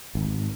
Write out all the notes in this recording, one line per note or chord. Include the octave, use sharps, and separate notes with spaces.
G#1